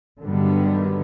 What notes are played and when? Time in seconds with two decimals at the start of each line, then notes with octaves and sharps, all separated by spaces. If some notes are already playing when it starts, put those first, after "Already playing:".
0.24 G2 D3 D#3 F#3 G3 B3